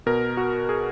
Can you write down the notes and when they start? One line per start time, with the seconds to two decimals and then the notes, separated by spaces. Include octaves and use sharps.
0.06 B2 A#4
0.37 F#4
0.69 G#4